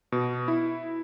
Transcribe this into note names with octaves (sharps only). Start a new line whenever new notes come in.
B2
E4